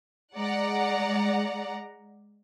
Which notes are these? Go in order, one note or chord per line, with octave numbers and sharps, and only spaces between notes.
G#3 D5 F#5 A#5